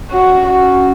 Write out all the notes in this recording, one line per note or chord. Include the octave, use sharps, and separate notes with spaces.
C#4 F#4
F#4